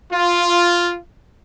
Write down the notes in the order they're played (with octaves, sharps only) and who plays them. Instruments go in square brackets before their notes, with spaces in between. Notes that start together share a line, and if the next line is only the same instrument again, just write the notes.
[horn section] F4